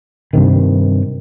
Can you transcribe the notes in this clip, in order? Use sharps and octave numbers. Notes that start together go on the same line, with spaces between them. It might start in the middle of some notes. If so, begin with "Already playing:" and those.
G2 C3 D#3